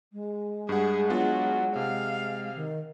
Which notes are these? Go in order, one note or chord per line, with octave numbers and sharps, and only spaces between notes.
G#3
G2 G#4 F#5
F#3 B3 D4 F4
C3 F5
D#3